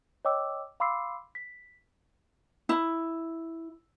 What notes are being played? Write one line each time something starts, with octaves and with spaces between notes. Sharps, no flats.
C#5 D#5 G5 D6 E6
F5 B5 C6 D6 E6 C7
B6
E4